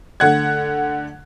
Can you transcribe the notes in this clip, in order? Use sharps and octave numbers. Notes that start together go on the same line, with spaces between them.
D3 A3 F#5 F#6 G#6